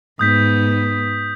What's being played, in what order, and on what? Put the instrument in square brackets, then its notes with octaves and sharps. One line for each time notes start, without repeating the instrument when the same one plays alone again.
[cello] G#2 B3 [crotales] D#6 G6 B6